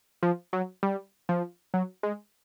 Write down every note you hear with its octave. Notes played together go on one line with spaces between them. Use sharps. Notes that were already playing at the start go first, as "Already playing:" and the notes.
F3
F#3
G3
F3
F#3
G#3